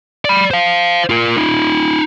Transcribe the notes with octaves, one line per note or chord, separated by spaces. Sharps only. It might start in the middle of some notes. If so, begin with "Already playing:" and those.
D5 B5
C5 F5
F4 A#4
D#4 F4